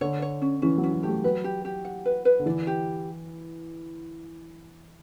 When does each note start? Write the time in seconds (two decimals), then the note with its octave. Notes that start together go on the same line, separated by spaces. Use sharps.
0.01 D3 C#5
0.22 C#5
0.42 C#4
0.62 E3 C#4
0.78 F#3
0.83 C#4
0.93 F#3
1.03 A3 G4
1.09 G3
1.24 F#3 B4
1.44 G4
1.65 G4
1.85 F#5
2.05 B4
2.25 B4
2.40 D3
2.46 E3 D5
2.67 G4